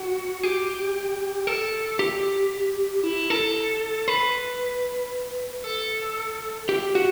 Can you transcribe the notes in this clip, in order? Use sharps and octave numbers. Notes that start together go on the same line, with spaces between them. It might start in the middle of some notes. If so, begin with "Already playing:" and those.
Already playing: F#4
G4
A4
G4
E4
A4
B4
A4
G4
F#4